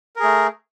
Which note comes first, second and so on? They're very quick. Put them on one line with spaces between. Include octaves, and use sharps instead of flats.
A#4 G#4 A3